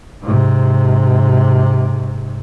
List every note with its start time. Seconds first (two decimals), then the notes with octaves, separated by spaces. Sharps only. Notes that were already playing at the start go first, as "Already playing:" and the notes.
0.23 G#2 C3